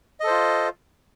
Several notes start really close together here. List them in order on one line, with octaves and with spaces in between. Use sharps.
D#5 A4 C5 F4